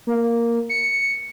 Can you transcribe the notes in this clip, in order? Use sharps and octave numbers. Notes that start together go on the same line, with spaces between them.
A#3
C#7